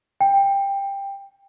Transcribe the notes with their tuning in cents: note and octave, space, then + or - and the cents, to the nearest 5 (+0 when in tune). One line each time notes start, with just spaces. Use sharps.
G5 +15